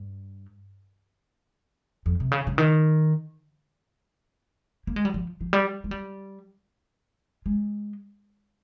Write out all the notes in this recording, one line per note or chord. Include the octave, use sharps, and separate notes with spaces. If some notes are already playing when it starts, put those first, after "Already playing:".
Already playing: G2
F2
C3
C#3
C#3
D#3
A#3
G#3
G3
F3
F3
G3
G#3
G3
G#3